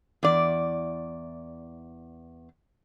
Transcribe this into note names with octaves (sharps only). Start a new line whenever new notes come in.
E2 D5